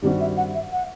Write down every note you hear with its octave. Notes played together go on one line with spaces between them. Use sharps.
G2 D#3 G3 C4 F#4 G4
E5
F#5
E5
F#5